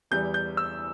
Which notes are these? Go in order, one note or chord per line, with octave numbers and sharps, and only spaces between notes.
E2 E3 G3 G6
G6
E6